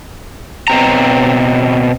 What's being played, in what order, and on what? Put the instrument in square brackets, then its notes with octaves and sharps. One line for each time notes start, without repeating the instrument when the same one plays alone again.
[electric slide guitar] B2 C4 A#5